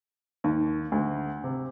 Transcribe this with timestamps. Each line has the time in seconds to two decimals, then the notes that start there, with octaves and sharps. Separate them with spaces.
0.44 D#2
0.92 D2
1.44 C3